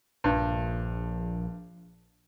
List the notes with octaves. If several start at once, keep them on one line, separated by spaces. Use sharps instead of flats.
A#1 G2